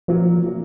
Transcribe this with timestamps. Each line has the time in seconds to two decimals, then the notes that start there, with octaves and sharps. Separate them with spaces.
0.08 A#2 F3 F#3 A#3
0.42 A#2 F#3 A#3